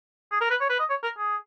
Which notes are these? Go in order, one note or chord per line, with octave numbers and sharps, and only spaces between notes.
G#4
A#4
B4
C#5
B4
D#5
C#5
A#4
G#4